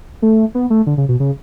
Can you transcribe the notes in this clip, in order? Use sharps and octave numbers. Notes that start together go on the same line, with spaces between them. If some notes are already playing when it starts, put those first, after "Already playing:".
A3
B3
A3
D3
C#3
B2
C#3